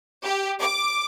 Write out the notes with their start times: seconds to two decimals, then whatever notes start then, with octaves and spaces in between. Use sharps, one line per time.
0.23 G4
0.60 D6